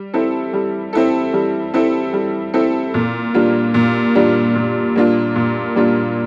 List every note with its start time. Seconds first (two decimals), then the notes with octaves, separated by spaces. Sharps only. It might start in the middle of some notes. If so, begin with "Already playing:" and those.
Already playing: G3
0.14 C4 E4 A4
0.53 G3
0.93 C4 E4 A4
1.33 G3
1.74 C4 E4 A4
2.13 G3
2.54 C4 E4 A4
2.94 A#2
3.34 G3 A#3 D4 F4
3.74 A#2
4.15 G3 A#3 D4 F4
4.55 A#2
4.96 G3 A#3 D4 F4
5.36 A#2
5.76 G3 A#3 D4 F4